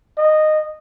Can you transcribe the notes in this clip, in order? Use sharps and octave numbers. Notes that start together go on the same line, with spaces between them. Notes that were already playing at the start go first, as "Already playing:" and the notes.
D#5